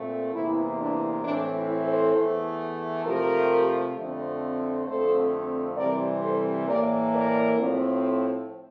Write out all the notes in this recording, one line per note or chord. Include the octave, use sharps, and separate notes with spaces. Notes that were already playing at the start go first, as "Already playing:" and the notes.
Already playing: A#2 A3 C4
E2 C3 E3 A#3 E4
D4
A2 E3 A3 C4 D4
E4
A4 C5
E2 E3 A3
C3 F3 A3 G4 A#4
F2 D3 A3 C4
F2 D3 A3 C4 A4 C5
C3 E3 G3 C4 A#4 D5
A4 C5
A2 E3 A#3 A#4 D5
A#4 D5
A2 F3 A3 C4